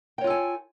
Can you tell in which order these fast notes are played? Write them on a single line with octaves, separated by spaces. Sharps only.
G5 C#5 F4 A4 G#5